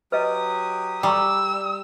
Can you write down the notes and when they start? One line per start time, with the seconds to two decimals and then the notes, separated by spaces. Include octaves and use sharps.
0.12 F#3 G4 B4 D#5 D#6
1.03 G3 G5 A#5 C#6 E6